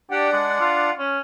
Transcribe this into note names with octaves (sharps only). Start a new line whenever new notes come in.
D4 G4 D5 F#5
G#3
F4
C#4